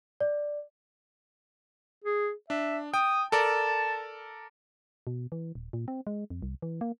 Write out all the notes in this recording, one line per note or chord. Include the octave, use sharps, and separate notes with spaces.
D5
G#4
D4 E5
G5 D#6
A4 A#4 D5 A5
B2
E3
D#1
A#2
C4
G#3
F2
C2
E3
A#3